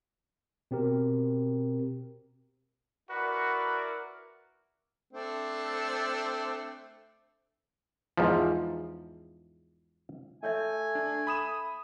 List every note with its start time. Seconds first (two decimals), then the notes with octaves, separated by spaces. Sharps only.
0.71 B2 C4 G4 A#4
3.10 E4 F#4 A#4 B4 D5
5.13 A3 C4 D4
8.17 E2 G#2 F3
10.43 A3 A4 C#5 E5 G#5
10.95 D4
11.27 B5 D#6 E7